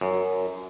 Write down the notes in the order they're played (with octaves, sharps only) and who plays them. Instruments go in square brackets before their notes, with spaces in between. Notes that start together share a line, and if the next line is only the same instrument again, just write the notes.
[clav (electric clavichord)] F#2